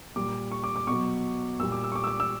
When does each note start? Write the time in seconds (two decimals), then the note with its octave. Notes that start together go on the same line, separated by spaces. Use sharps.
0.16 A#2 G3 D6
0.52 C#6
0.64 D6
0.76 D6
0.87 B2 F#3 C#6
1.59 A#2 E6
1.63 G3
1.72 D6
1.84 E6
1.92 C#6
1.96 D6
2.04 E6
2.07 D6
2.20 E6